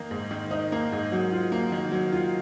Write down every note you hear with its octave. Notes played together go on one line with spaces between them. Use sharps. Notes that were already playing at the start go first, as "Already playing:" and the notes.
Already playing: D#3 A#3 D#4
G#2
D#3
D#4
A#3
G#2
F#3
F4
A#3
D#3
F#3
F4